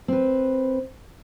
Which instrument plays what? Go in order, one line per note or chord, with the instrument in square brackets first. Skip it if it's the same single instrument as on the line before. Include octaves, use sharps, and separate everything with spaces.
[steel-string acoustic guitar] C4 B4